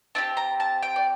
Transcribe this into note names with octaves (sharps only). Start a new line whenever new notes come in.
C4 E4 G4 A5
A#5
A5
G5
D5